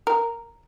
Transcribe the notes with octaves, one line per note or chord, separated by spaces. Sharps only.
A#4